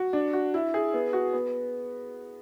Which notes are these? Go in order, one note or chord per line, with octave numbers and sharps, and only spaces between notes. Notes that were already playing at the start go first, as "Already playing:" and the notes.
Already playing: F#4
D4
F#4
E4
G#4
B3
F#4
B3